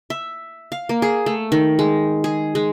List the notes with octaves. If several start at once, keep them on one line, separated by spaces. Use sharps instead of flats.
E5
F5
A#3
G#4
A3
D#3
G#3
G#4
G#3